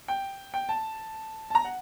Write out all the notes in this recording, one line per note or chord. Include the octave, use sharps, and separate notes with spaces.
G5
G5
A5
A5
A#5
F#5